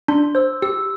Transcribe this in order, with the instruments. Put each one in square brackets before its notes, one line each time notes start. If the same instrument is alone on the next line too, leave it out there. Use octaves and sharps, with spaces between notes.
[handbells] D4 [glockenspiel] C6
[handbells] C5 [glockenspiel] E6
[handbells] G4 [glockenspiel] E6